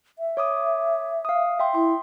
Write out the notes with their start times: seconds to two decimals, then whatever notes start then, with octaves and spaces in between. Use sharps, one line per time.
0.19 E5
0.37 C#5 D6 D#6
1.25 F5 D#6
1.59 E5 G5 C6
1.75 E4 C6